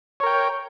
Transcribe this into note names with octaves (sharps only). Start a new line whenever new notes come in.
A#4 C#5 G5